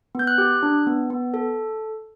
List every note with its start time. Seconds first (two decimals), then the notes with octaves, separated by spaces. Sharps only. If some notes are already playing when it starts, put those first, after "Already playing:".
0.15 B3 G6
0.27 F#6
0.38 G4
0.63 D4
0.87 B3
1.10 B3
1.34 A4